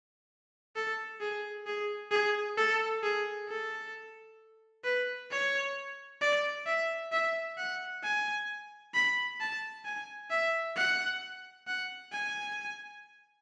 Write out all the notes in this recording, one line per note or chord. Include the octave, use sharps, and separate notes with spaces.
A4
G#4
G#4
G#4
A4
G#4
A4
B4
C#5
D5
E5
E5
F#5
G#5
B5
A5
G#5
E5
F#5
F#5
G#5